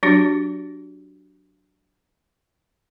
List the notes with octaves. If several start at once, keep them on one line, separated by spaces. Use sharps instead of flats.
F#3 D4 F#4 G4